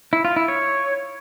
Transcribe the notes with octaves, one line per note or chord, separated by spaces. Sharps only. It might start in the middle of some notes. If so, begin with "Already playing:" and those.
E4
F4
E4
C#5